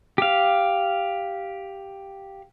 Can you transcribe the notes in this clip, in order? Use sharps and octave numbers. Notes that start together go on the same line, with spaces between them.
G4 F5